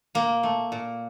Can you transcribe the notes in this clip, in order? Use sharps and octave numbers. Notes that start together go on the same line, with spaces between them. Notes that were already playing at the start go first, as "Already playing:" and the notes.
A#2 A#3
A3
A#2